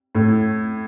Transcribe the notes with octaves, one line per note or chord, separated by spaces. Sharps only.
A2